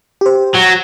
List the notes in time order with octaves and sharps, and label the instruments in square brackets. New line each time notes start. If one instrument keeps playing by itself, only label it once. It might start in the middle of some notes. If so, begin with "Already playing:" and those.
[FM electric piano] G4 C5
[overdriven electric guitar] F#3